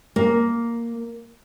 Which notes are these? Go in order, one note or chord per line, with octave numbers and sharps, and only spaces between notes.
A#3